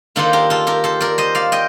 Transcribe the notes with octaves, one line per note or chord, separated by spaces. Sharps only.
D#3 A#3 D4 F4 A4 C5
G4 A#4
F4 A4
G4 A#4
A4 C5
A#4 D5
C5 D#5
D5 F5
D#5 G5